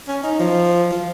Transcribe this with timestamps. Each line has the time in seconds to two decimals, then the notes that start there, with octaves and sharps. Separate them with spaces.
0.08 C#4
0.24 D#4
0.39 F3
0.92 F3